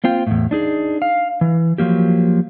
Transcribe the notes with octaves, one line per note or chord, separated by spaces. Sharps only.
A#3 C4 F4 G5
E2 A2
D4 D#4 G#4
F5
E3
F3 F#3 A#3 G4